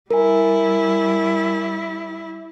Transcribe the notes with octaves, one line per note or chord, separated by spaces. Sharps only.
G3 E4 A#4 G#5